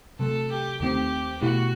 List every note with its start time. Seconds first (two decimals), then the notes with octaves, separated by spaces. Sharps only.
0.19 C3 F#3 A3 A4
0.51 G4
0.80 D#2 D#3 A3 C4 G4
1.42 B2 A3 E4 F#4 G4